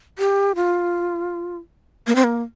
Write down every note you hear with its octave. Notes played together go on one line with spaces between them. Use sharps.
G4
F4
A#3
C4
A#3